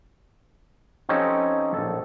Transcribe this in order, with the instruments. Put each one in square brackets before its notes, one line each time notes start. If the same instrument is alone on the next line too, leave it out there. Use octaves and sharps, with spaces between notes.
[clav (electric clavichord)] F3 C4 C#4 D#4 G4 A4
A#1 A4